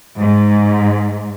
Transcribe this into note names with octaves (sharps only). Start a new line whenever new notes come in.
G#2